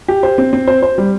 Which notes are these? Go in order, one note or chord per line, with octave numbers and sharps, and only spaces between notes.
G4
C5
C4
C4
C5
C5
G3